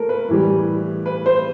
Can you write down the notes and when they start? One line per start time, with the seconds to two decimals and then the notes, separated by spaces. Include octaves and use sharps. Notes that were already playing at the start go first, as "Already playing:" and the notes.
Already playing: A3 A4 A#4
0.09 B4
0.28 A2 E3 G3
1.06 B4
1.26 C5